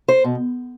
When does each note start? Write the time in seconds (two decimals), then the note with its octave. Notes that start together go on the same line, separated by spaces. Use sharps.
0.08 C5
0.24 B2